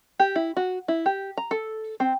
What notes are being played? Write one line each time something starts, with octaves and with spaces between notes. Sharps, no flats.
G4
E4
F#4
E4
G4
A#5
A4
C4